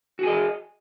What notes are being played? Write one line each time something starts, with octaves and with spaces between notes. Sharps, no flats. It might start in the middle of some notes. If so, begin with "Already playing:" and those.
F#4 G#4 D#5